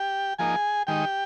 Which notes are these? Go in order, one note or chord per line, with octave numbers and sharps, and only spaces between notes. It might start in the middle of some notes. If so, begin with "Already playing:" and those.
Already playing: G4 G5
F3 A#3 D#4 G#4 G#5
D#3 G#3 D#4 G4 G5